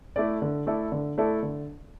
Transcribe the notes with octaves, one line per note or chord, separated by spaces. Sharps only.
A3 E4 A4 D5
D3
A3 E4 A4 D5
D3
A3 E4 A4 D5
D3